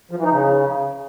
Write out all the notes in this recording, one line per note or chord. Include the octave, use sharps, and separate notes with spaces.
F3
E3
D#4
C#3